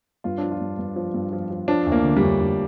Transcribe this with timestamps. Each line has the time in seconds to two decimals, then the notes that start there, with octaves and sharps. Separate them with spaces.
0.24 G2 F4
0.38 D4
0.43 F3
0.52 F4
0.61 G2
0.79 G2
0.96 F3
1.14 G2
1.33 F3
1.51 F3
1.68 F3 D4
1.86 D2
1.92 A#3
2.04 D3
2.17 G3
2.22 D2
2.41 D2